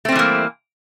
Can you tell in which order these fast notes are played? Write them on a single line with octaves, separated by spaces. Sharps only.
A3 C4 G3 E3 A#3